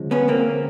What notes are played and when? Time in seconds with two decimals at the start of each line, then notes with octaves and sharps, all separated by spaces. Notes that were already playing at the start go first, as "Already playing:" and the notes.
Already playing: D2 C#3 F3 G#3
0.11 B3 C#4
0.28 A#3 C4